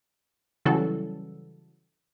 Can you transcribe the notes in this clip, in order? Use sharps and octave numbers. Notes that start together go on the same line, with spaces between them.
C#3 E3 F#3 G3 A4